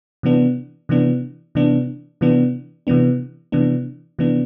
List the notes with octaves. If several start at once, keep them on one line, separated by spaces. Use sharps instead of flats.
C3 E3 B3 D4
C3 E3 B3 D4
C3 E3 B3 D4
C3 E3 B3 D4
C3 E3 B3 D4
C3 E3 B3 D4
C3 E3 B3 D4